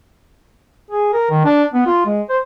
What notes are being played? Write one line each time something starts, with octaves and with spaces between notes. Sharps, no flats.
G#4
A#4
D#3
D4
B3
F4
G#3
C5